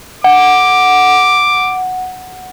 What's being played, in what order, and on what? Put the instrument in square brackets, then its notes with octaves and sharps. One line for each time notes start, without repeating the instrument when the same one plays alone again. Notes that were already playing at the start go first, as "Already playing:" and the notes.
[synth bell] F#5 [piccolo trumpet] D6